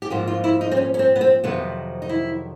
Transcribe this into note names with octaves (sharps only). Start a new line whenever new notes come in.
G4
G#2 F3 A#3 F#4
F4
E4
D#4
C4
C#4
C#4
C4
B3
C4
F2 C3 D#3 F#3 B3
D#4
E4